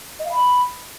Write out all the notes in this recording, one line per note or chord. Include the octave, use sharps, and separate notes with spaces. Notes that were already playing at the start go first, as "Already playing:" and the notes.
D#5
F5
B5